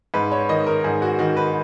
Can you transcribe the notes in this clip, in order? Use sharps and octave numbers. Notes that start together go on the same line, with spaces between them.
G#2 B4
C#5
D#3 D#5
A#4
G#2 G#4
F#4
D#3 F#4
B4